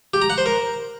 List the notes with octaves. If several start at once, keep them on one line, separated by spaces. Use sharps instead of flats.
G4
A#5
F#5
C5
A#4